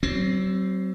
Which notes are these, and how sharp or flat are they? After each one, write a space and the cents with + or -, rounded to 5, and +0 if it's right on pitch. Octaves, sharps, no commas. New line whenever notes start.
F#3 +35 C4 +0